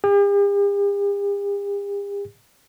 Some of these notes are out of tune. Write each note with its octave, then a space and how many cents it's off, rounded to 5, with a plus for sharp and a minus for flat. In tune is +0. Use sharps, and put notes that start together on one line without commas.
G4 +45